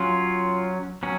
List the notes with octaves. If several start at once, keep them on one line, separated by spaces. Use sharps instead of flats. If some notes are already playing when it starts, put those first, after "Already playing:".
Already playing: F#3 C#4 F4
F#3 C#4